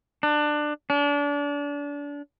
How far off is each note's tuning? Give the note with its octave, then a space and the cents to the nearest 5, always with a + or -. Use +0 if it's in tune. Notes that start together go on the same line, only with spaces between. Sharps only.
D4 +20
D4 -30